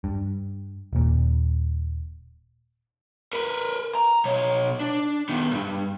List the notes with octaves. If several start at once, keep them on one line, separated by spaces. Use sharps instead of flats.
G2
D#1 A#2
A#4 B4
A#5
B2 C#5
D4
D#3 B3
C2 G2